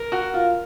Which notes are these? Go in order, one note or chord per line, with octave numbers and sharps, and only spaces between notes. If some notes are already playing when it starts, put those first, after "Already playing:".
Already playing: A#4
F#4
F4